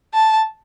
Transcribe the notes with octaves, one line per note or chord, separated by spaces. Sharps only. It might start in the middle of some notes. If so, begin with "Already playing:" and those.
A5